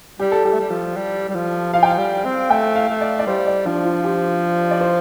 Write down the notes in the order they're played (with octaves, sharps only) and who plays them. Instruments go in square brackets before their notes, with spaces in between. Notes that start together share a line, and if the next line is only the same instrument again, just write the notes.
[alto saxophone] G3 [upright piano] G4
[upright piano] A4
[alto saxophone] G3 [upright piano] G4
[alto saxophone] A3
G3
F3
G3
G3
F3
[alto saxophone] F3 [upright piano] F5
[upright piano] G5
F5
[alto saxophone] G3
C4
[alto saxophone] A3 [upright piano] G5
[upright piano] F5
[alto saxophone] A3
[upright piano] D5
D5
[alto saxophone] G3 [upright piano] C5
[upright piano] D5
[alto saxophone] F3 [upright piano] D4
[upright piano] F4
G4
D5
C5